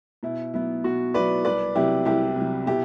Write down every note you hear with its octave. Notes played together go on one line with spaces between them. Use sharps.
B2 E4
F#3 B3 E4
B2 F#4
F#3 B3 E4 B4 D5
C2 B4 D5
C3 F#3 E4 G4
C2 E4 G4
C3
F#3
B2 E4 G4